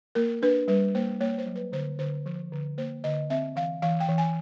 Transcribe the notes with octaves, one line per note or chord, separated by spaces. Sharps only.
A#3 A#4
D4 B4
G3 B4
A#3 C5
A#3 C#5
C5
F#3
B4
D3 C5
D3 C5
F3
D3
A#3 C5
D3 D#5
C4 E5
E3 F5
E3 F5
G5
E3
G#5